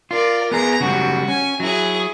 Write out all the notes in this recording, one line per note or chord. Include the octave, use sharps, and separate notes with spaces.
F4 A#4 D5
B3 G#4 A#5
C#3 F#3 G3 F#4
C#4 G#5
F#3 E4 G#4